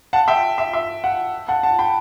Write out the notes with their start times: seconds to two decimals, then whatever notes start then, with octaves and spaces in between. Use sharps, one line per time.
0.13 F#5 A5
0.28 E5 G5
0.58 E5
0.73 E5
1.04 F#5
1.48 F#5 A5
1.63 F#5 A5
1.79 G5 B5